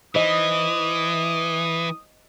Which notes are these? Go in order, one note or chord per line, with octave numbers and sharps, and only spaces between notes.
E3 C5 D#5 D#6